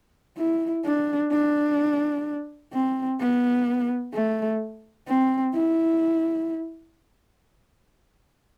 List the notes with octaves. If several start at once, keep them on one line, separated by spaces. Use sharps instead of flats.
E4
D4
D4
C4
B3
A3
C4
E4